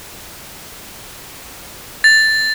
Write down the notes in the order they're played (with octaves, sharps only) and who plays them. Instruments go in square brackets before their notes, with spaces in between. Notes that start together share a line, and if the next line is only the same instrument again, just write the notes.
[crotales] A6